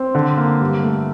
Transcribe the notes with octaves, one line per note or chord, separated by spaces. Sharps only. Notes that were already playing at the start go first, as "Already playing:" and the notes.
Already playing: C4
D3
A#3
G2
A3